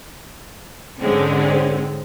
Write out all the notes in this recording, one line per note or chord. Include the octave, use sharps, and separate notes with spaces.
G#2 D3 G#3 C4 C#4